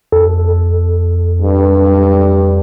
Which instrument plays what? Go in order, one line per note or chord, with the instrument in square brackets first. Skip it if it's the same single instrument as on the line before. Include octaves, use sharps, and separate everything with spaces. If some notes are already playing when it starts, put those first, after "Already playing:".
[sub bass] F2 [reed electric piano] A4
[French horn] G2